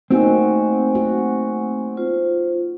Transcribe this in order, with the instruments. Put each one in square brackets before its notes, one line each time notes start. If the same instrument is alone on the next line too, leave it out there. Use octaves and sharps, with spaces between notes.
[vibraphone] A3 G#5 [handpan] A#3 D#4 F#4 [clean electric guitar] C4
[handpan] F#4
[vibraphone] F4 C5